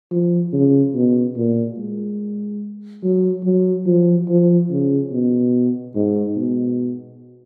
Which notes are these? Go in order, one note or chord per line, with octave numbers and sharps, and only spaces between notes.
F3
C#3
B2
A#2
G#3
F#3
F#3
F3
F3
C#3
B2
G#2
B2